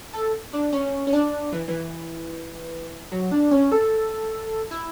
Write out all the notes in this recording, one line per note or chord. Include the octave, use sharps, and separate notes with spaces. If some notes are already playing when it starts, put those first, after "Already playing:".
A4
D4
C#4
C#4
D4
E3
E3
F#3
D4
C#4
A4
E4